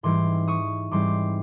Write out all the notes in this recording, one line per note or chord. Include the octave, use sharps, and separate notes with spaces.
G#2 E3 G3 C4 C6 D6
C#6 D#6
G#2 E3 G3 C4 C6 D6